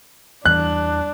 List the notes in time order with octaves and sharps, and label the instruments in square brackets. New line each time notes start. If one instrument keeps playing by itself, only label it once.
[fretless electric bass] E2 E3 G3 [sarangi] D4 [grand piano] F#6